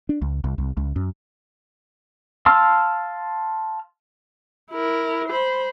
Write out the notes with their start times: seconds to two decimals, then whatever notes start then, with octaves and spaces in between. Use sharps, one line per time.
0.09 D4
0.22 C#2
0.44 C2
0.58 C2
0.77 C#2
0.96 F#2
2.46 F5 A5 C6 E6 F6
4.72 E4 A#4
5.28 C5 B5